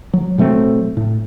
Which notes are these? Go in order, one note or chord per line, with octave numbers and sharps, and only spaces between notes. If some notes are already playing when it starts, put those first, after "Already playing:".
F#3
B2 F#3 A3 C4
A2